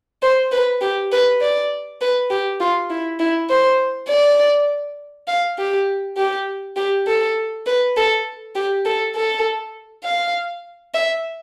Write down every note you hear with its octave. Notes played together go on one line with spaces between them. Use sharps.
C5
B4
G4
B4
D5
B4
G4
F4
E4
E4
C5
D5
F5
G4
G4
G4
A4
B4
A4
G4
A4
A4
F5
E5